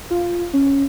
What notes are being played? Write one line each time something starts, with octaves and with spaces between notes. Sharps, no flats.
F4
C#4